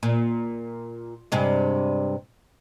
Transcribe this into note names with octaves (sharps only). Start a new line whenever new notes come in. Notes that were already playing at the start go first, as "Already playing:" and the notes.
A#2
G2 C3 G#3